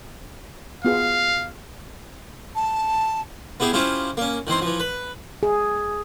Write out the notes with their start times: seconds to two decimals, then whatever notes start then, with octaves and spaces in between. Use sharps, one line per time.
0.85 B3 F4 G#4 F5
2.55 A5
3.60 B3 E4 G4 G#4
3.73 C#4 E4 F4 G4 C5
4.17 A#3 C#4
4.47 D#3 E3 C4 C6
4.62 E3 F3
4.80 B4
5.43 G#4